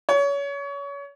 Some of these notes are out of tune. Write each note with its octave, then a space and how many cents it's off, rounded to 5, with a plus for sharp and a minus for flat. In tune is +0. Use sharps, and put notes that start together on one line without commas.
C#5 +30